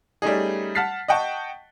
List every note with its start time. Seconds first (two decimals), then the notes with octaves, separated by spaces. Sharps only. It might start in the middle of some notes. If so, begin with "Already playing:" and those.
0.22 G3 A3 C#4 D#4 G#4
0.75 F#5 A5 F6 A6 B6 C7
1.08 D#5 F#5 G5 A5 C#6